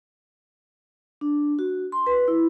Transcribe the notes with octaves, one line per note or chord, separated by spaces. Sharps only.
D4
F#4
C6
B4
E4